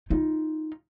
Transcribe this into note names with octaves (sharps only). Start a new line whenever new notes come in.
D#4 F4